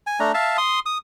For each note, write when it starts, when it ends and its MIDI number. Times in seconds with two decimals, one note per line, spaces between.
0.07 0.20 80
0.20 0.32 57
0.20 0.32 62
0.20 0.32 82
0.34 0.57 76
0.34 0.57 77
0.34 0.57 81
0.58 0.79 84
0.58 0.79 87
0.86 0.98 87